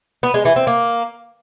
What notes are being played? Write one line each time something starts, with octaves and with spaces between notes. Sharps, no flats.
B3
G#3
E3
C4
A#3